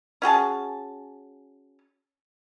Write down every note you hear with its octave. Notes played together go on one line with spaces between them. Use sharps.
C#4 F#4 G#4 A5